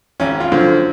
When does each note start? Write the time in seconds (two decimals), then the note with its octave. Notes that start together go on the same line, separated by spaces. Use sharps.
0.20 G#1 C#4
0.40 F4
0.51 F#2 D3 F3